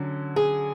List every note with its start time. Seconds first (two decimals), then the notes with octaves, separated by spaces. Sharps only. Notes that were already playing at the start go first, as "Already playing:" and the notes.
Already playing: D3 F#3 C#4
0.36 G#4